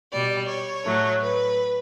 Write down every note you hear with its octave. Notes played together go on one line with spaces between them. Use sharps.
B2 G3 D5
C#5
A2 F#3 A3
B4